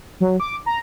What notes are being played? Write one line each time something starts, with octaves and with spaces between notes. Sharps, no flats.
F#3
D6
A#5